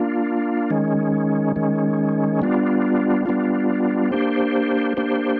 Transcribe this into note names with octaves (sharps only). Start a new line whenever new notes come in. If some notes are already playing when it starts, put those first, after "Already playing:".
Already playing: A#3 D4 F4
D#3 G#3 C#4
D#3 G#3 C#4
G3 B3 D4 F4
G3 B3 D4 F4
A#3 D4 G4 C5
A#3 D4 G4 C5